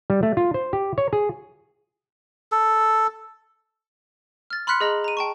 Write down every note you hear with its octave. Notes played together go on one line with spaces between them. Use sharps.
G3
A3
F4
C5
G4
C#5
G#4
A4
F6 A6
B5 C6 F6 F#6 B6 C#7
G#4 D#5 A#5 F#7
A#5 D#7
G5 A5 C#6